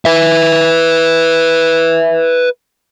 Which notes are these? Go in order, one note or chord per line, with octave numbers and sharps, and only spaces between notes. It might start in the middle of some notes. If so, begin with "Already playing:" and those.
B4 E5